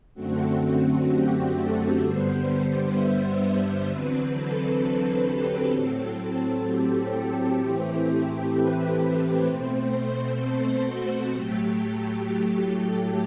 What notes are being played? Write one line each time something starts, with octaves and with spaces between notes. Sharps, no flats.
F#2 D3 A3 C4 F#4
F#4
G4
A4
G2 D3 G3 B3 C5
E5
C5
E2 D3 F#3 C4 B4
A4
A4
G4
A2 F#3 C4 A4
A4
G4
A2 E3 A3 C4
B4
B4
B2 A3 C4 C5
C5
A4
F#4
A2 F#3 A3 G4
G4
A4